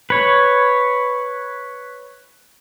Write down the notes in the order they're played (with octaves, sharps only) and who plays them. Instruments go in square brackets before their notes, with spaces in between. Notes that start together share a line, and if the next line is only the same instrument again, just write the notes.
[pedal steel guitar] B4 C#5